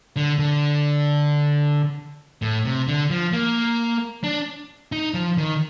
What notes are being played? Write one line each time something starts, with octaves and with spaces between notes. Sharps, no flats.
D3
D3
A2
C3
D3
F3
A#3
D4
D#4
F3
D#3